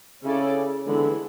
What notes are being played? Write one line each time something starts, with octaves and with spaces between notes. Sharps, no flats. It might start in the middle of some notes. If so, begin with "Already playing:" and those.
C#3 C#4 E4 A4 D5
D3 E3 G#3 B3 E4 G#4